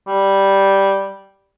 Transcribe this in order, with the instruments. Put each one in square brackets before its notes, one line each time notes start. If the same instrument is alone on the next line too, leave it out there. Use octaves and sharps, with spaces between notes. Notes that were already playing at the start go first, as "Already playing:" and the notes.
[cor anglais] G3